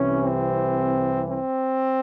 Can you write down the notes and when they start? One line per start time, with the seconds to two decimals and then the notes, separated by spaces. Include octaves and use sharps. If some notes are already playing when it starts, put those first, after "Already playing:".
Already playing: C2 C3 E3 C#4
0.23 C4
1.28 C4